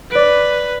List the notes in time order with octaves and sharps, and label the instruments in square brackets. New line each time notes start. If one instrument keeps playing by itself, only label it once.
[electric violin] B4 [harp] D5 D7